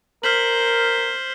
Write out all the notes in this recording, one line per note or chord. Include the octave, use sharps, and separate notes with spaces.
A#4 C5 F6 B6 F#7